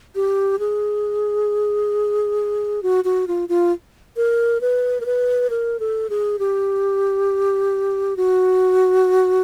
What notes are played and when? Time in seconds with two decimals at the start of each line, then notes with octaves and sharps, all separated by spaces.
0.15 G4
0.59 G#4
2.83 F#4
3.04 F#4
3.28 F4
3.49 F4
4.16 A#4
4.61 B4
5.01 A#4
5.06 B4
5.50 A#4
5.80 A4
6.10 G#4
6.39 G4
8.17 F#4